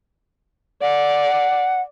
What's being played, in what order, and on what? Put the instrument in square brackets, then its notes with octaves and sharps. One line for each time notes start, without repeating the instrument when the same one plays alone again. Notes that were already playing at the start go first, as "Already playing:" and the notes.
[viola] D5 [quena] F#5